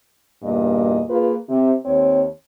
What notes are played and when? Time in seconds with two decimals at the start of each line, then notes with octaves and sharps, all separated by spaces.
0.43 E2 G2 A#2 A#3 D#5
1.10 A#3 F4 G#4 B4
1.49 C3
1.86 D#2 C4 C#5